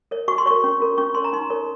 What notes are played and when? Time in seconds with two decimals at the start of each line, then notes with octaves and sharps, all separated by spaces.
0.11 A#4 C#5
0.28 F#4 C#6
0.38 C6
0.46 A#4 C#5 C#6
0.64 C#4
0.80 F4 A#4 C#5
0.98 C#4 C#6
1.15 F4 A#4 C#5 C6
1.24 A#5
1.33 D#4 C6
1.50 A#4 C#5